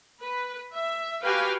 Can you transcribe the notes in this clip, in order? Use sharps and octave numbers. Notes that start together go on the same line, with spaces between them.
B4
E5
F#4 G4 B4 F5 G5 G#5